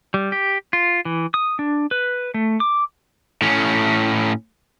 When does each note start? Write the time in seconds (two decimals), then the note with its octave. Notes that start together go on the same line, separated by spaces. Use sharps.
0.14 G3
0.32 G4
0.73 F4
1.05 E3
1.34 D#6
1.59 D4
1.91 B4
2.34 A3
2.60 D6
3.42 A2 C#4